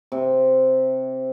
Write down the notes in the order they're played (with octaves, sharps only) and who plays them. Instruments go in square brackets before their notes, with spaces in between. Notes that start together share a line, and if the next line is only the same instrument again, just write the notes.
[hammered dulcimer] C3